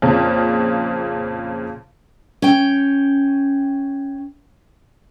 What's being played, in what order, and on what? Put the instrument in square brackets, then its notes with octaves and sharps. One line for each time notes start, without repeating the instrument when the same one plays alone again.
[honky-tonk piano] F2 A#2 C#3 A#3
[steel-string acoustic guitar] C#4 G5